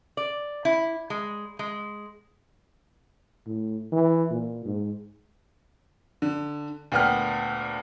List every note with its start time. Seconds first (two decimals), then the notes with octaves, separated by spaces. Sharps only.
0.17 D5
0.65 E4
1.10 G#3
1.59 G#3
3.46 A2
3.92 E3
4.31 A#2
4.65 G#2
6.22 D3
6.92 D2 A#2 B3 G5 F6